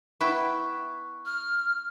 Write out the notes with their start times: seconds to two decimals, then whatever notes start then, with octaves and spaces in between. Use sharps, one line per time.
0.21 B3 E4 G5 C#6 F#6
1.26 F6